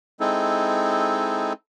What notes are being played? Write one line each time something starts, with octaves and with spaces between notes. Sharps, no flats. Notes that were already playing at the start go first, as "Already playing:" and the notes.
G#3 C4 D#4 E4 A4